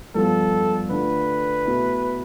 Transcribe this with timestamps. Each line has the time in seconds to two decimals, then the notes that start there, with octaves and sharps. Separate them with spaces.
0.15 G2 F3 B3 F4 A4
0.90 D3 A3 D4 F4 B4
1.66 B2 A3 E4